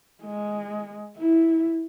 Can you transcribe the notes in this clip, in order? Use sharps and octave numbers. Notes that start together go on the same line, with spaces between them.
G#3
E4